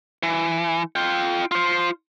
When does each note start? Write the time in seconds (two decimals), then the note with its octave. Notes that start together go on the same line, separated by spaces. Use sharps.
0.23 E3
0.96 F4 G5
1.51 F4 C5